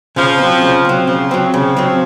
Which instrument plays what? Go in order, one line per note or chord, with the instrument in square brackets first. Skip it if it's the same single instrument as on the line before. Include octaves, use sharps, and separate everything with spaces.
[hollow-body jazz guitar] C#3 [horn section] F3
[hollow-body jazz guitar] F#3 C4
C#3
F#3 C4
[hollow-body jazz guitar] C#3 [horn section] F3
[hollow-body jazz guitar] F#3 C4
[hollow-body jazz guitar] C#3 [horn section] F3
[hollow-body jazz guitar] F#3 C4